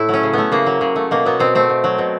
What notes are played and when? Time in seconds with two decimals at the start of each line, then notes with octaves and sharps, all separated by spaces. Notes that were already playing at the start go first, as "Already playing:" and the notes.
Already playing: A2 A3 E4
0.09 F#3 C#4
0.23 C#3
0.33 A3 B3
0.52 C#3 A#3
0.66 F#3
0.81 C#3
0.96 A3
1.11 B2 A#3
1.25 F#3 B3
1.40 B2 C4
1.55 A3 C4
1.69 B2
1.84 F#3
1.98 B2